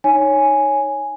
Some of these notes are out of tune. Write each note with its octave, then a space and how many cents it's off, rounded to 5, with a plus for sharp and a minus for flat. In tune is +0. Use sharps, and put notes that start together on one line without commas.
D#4 +0 C#5 +0 G#5 +0